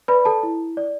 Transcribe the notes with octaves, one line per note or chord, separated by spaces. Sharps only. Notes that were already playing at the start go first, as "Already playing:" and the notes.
B4 D5 B5
A4 A5
E4
D5